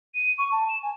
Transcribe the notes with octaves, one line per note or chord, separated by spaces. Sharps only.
D#7
C#6
A5
E7
G#5